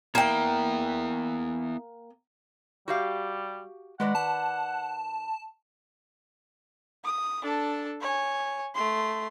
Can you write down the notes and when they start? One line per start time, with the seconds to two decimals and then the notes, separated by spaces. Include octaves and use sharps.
0.15 A#3 B3 E4 E5 G5
2.88 G3 F#4 G4 F5
4.00 D#3 G#3 B4 D5 F#5
4.15 A5
7.04 D#6
7.43 D4 A4
8.01 C#5 G#5
8.75 A3 C6